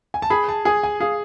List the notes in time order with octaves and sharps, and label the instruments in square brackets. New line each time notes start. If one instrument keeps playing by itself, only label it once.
[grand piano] G#5
A5
[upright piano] G#4 [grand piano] B5
[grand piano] A5
[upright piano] G#4 [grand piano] G#5
[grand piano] G#5
[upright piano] G#4 [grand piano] F5